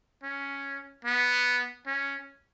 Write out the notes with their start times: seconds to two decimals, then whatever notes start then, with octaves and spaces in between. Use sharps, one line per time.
0.23 C#4
1.05 B3
1.86 C#4